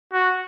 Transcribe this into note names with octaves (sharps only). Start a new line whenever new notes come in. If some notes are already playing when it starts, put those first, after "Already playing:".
F#4